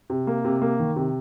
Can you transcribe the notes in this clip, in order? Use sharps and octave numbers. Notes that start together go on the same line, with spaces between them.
C3
A#3
C3
A#3
D#3
C3